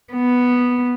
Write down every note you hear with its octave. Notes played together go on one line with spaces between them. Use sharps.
B3